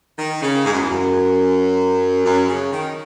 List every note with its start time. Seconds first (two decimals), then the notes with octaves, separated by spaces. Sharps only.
0.19 D#3
0.42 C#3
0.65 G#2
0.72 F#2
0.81 E2
0.89 F#2
2.25 F#2
2.48 C#3
2.72 D#3